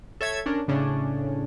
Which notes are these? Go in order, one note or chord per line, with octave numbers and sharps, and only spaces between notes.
A4 C#5 E5 G#6
C#4 D4 A#4
A2 C#3 C#4 D4